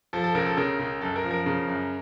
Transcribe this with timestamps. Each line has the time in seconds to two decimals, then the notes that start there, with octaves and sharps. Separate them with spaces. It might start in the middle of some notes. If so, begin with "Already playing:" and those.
0.13 F3 A4
0.24 A4
0.34 C#2 A#4
0.46 A4
0.57 C#3 A#4
0.79 C#2
1.01 F#2 A4
1.16 A#4
1.24 F3
1.31 A#4
1.46 C#3
1.68 F#2